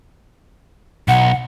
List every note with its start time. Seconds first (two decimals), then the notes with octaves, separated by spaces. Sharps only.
1.08 B1 F#5